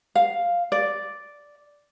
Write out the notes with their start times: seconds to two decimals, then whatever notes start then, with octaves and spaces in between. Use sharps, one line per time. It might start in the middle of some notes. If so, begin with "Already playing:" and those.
0.15 F5
0.72 D5